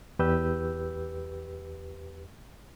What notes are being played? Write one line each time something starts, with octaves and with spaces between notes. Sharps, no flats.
E2 G4 B4 E6 G6